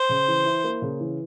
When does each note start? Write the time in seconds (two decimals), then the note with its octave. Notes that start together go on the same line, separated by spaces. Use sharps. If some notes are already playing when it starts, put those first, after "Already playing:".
Already playing: C5
0.09 C#3
0.28 E3
0.45 E4
0.64 A#3
0.82 C#3
1.00 E3